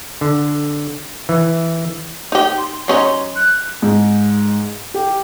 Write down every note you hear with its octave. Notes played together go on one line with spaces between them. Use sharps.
D3
E3
D#4 G4
C6
F#3 C#4 D#4
F#6
G#2
G4